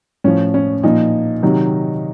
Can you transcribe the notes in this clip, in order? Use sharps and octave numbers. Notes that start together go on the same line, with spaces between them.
A2 F3 C#4
C#4
A#2 F3 D#4
C3 D#3 F#3